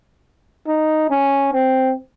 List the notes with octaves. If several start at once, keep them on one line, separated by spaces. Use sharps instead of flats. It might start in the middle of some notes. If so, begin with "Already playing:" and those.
D#4
C#4
C4